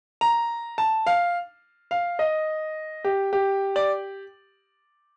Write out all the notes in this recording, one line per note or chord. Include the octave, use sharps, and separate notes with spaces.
A#5
A5
F5
F5
D#5
G4
G4
D5